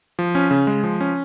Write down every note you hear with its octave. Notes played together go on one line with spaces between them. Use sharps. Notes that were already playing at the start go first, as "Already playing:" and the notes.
F3
C#4
C#3
G#3
F3
C#4